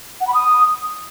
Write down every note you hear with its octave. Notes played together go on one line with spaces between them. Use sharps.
F#5
B5
D#6